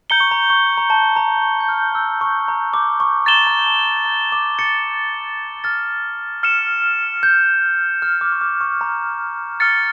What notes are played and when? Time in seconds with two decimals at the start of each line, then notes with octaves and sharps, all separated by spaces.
0.10 A#5 G6 C#7 G7
0.20 C#6
0.31 A#5
0.50 C#6
0.78 A#5
0.90 A5
1.16 A#5
1.42 C#6
1.60 G6
1.69 F6
1.95 E6
2.21 C#6
2.48 A#5
2.74 D6
3.00 C#6
3.26 A#5 A6 E7 G7
3.47 A#5
3.66 A5
3.86 A#5
4.05 A#5
4.32 D6
4.59 A6 C#7
5.64 F6 A6
6.43 F6 C#7 E7
7.23 G6
8.02 F6
8.21 D6
8.32 C#6
8.41 D6
8.61 C#6
8.81 A#5
9.60 F6 A6 C#7